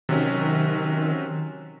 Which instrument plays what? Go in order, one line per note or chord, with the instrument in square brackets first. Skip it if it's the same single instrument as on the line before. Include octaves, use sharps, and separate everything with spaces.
[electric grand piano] C3 F#3 C#4 [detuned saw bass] D#3